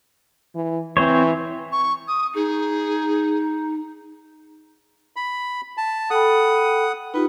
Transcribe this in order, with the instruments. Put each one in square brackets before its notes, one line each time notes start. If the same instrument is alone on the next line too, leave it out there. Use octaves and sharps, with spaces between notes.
[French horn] E3
[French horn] E3 [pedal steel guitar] C4 C5 C#5
[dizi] C#6
D#6
[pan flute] D#4 [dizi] G#4
[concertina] B5
A5
[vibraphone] A4 G5 B5 [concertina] F#5 D#6
[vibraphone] D#4 F4 G4 [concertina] B4